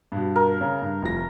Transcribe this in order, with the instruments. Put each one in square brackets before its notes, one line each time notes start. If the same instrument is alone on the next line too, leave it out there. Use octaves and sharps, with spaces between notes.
[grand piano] G2 B2
[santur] A#4
[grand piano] C#3 C#4
G2
F1 F3 A#6